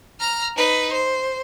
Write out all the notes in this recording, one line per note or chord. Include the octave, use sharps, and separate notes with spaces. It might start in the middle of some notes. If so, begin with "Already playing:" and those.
A#5 F6
D#4 B4
C5